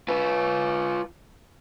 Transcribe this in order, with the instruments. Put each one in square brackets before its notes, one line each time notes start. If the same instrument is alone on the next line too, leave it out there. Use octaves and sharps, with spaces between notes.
[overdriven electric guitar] F4 B4